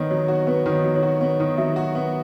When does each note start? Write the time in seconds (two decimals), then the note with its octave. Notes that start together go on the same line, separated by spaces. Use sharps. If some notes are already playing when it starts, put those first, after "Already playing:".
Already playing: D#3 B3 C#5 D#5
0.10 F#3 C#5
0.28 F#4 C#5
0.47 B3 B4
0.66 D#3
0.72 C#5
0.84 F#3
0.96 C#5
1.03 F#4
1.21 B3 C#5
1.40 D#3
1.57 F#3 E5
1.76 F#4
1.95 B3